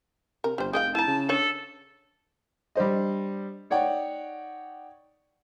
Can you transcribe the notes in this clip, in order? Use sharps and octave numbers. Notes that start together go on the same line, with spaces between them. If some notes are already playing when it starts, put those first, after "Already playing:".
C3 A#4
G1 G3 C5
F1 G#4 D#5 F5 G5
E4 A5 A#5
C#3
D4 A4 C#5
G3 D4 C5 D#5
D#4 C#5 D5 F#5 G5